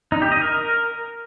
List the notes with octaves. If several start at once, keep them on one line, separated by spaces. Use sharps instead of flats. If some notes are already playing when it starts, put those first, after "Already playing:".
D#4
G4
D#5
A#4